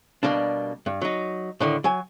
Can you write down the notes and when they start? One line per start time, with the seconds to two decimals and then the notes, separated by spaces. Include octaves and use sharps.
0.23 B2 G3 A#3 D4
0.86 G2
1.01 F#3 D#4
1.60 A2 D3 D#3
1.84 F#3 G#5